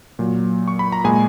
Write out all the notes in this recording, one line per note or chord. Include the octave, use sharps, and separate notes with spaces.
A#2 F#3
C#6
B5
A#5
A#2 G#3 G#4 G#5